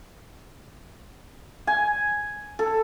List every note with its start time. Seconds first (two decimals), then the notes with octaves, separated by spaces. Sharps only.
1.67 G#5
2.59 A4